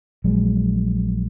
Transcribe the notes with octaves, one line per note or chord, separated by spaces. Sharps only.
A#1 F#3 G#3